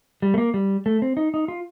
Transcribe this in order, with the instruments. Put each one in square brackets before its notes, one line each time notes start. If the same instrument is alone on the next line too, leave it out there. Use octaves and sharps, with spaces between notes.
[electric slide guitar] G3
A3
A#3
G3
A3
C4
D#4
D#4
F4